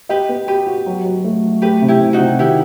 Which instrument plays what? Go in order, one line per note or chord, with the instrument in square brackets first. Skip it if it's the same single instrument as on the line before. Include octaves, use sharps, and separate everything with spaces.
[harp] G4 B4 [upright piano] D#5
[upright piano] B3
[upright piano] F#4 [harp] G4 B4
[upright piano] F#4
F#3
F#3
A3
F#3
[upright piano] A3 [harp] G4 B4
[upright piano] C3
[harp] E4 G4
[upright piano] C3
[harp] D#4 F#4
[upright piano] C3
[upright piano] D#3 [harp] E4 G4